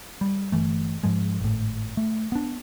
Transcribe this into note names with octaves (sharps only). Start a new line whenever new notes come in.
G3
G1 E3 A3
G#2 F3 G#3
G#1 A2
A3
B3 D4